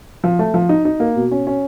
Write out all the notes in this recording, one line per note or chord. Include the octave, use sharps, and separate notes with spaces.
F3
A3
F3
D#4
D#4
A#3
B2
C#4
C#4